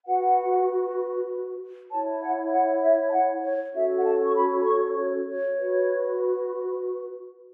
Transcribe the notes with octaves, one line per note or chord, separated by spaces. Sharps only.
F#4 B4 F#5
E4 C#5 A5
F#5
F#5
E5
A5
F#5
C#5
C#4 F#4 A4 C#5 E5
F#5
A5
C#6
B5
B5
C#6
C#5
C#5
F#4 B4